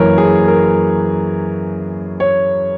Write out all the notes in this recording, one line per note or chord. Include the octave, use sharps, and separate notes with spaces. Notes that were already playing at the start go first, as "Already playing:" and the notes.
Already playing: F#2 E3 A#3 A#4 C#5
G#4
A#4
C#5